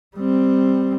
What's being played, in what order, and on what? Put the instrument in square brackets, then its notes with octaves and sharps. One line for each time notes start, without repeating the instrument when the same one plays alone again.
[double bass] G3 C4